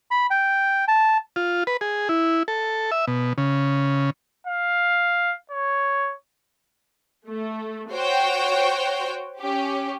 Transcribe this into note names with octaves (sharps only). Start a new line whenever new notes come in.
B5
G5
A5
F4
B4
G#4
E4
A4
E5
B2
C#3
F5
C#5
A3
F#4 C5 C#5 G5
C#4 G4